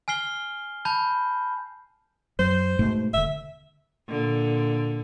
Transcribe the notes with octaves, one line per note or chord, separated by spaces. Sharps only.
G#5 F6 C7 G7
A5 B5 G6
F#2 F#3 C5
G#2 B2 A3
E1 D3 E5
A#2 D3